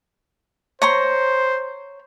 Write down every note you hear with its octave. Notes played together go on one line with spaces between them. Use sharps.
C5 C#5 A#5 C6